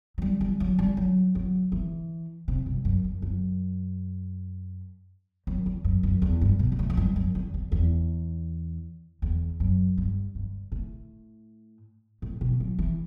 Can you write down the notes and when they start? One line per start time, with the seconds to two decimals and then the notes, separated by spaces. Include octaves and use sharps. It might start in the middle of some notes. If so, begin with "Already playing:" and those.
0.18 F#3
0.22 G3
0.41 G3
0.60 F#3
0.79 G3
0.97 F#3
1.35 F#3
1.72 E3
2.48 C3
2.66 G2
2.85 F#2
3.04 F#2
3.22 F#2
5.47 F#2
5.66 E2
5.84 F#2
6.03 F#2
6.22 E2
6.41 G2
6.59 B2
6.72 B2
6.79 A2
6.90 F#2
6.97 G2
7.16 F#2
7.35 E2
7.54 E2
7.72 E2
9.22 E2
9.60 F#2
9.98 G2
10.35 G2
10.72 A2
12.22 A2
12.41 B2
12.60 F#3
12.79 E3